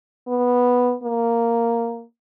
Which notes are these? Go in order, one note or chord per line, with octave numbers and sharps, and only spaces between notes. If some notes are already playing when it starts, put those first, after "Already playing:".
B3
A#3